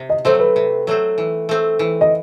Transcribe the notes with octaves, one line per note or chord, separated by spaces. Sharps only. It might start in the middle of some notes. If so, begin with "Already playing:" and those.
Already playing: C3
D#5
F#3 A3 C4 C5
B4
C3
F#3 A3 C4
E3
A3 C4
E3
D#5